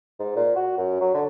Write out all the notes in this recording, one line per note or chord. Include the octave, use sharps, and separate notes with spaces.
G#2
A#2
F#4
F#2
F#3
D3